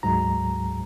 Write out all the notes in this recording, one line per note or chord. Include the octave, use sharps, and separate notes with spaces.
D2 G#2 F#3 G#3 A#5